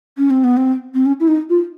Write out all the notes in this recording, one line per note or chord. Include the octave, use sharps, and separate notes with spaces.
C#4
C4
B3
C4
C4
C#4
E4
D#4
F4